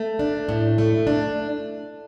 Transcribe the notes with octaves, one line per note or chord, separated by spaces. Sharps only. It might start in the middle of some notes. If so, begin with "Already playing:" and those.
Already playing: A3
D4
A2
A3
D4